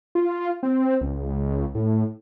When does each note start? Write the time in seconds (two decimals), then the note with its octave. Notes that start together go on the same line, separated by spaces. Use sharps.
0.15 F4
0.63 C4
1.01 C#2
1.75 A2